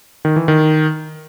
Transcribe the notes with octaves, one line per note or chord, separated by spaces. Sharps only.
D#3
E3
D#3